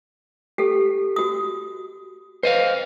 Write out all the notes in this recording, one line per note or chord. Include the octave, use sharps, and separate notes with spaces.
G4 A4
F#4 D#6
B4 C5 D#5 F5